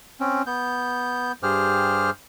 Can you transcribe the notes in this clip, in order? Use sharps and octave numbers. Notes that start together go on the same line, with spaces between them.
C4 C#4
B3 G6
G2 G4 G#4 C5 F6